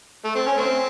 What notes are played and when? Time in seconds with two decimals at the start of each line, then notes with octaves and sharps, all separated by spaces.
0.25 A3
0.35 C4
0.47 C#4
0.58 A3 C4